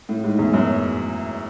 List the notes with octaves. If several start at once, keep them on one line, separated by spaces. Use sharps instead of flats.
A2
G#2
E2
F#2